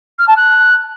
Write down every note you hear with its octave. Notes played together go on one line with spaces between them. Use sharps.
F6
A5
F#6